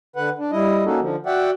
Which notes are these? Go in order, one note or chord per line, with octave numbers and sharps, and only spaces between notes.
D3 B4 F#5
D4
G3 E4 D#5
A#3 C#4 D#4 F#4 A4
D3 F3
F#4 D5 E5 F#5 G5